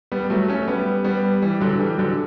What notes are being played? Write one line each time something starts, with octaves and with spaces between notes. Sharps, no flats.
G3 B3
F#3 A3
A3 C#4
G3 B3
G3 B3
E3 G3
D3 F#3
E3 G3
D3 F#3